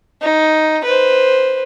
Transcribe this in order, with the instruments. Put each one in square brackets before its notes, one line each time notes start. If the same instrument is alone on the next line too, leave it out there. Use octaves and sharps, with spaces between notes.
[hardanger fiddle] D#4
B4 C5